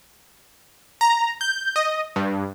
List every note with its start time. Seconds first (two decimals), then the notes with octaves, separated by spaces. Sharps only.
1.01 A#5
1.41 G6
1.76 D#5
2.16 G2